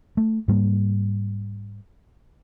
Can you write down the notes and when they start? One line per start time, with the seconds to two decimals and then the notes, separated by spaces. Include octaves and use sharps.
0.17 A3
0.48 G#2 G3 A#3